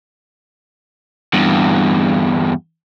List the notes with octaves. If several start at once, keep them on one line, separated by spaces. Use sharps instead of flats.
E2 G2